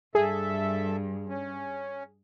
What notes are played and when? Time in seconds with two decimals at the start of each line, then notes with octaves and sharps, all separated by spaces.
0.15 G2 G#4 A4 E5
1.29 C#4